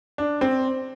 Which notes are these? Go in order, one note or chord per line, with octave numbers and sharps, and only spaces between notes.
D4
C4